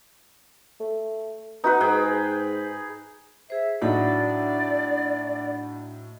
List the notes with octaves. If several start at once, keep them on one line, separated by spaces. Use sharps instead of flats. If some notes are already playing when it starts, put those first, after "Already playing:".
A3
B3 D#4 F#4 B4
G#2 G#4 G5
G#4 C5 E5
A2 F#3 D4 D#4 D5 F#5 B5